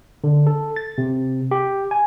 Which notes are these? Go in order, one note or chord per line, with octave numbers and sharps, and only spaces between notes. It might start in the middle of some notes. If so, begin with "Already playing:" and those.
D3
A4
A6
C3
G4
G#5